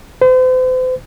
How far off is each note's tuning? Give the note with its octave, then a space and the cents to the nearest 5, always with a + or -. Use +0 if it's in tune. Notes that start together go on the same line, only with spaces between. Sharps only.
C5 -40